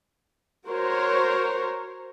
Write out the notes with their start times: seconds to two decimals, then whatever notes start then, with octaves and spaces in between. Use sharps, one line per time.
0.67 F#4 A#4 C5 C#5